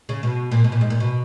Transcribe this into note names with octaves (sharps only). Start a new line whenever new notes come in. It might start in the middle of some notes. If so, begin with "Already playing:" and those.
C#3
B2
A#2
B2
A#2
G#2
A#2
B2